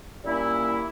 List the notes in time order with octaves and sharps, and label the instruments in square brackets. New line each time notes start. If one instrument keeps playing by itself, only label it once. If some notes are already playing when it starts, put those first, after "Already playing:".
[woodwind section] A#2 G3 A#3 C#4 E4